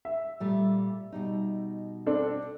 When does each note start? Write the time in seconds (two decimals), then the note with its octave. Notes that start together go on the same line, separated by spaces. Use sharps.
0.05 E5
0.40 A#2 G3 A3
1.12 B2 G3 D#4
2.06 C4 D4 A4